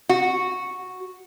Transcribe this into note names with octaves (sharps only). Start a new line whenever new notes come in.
F#4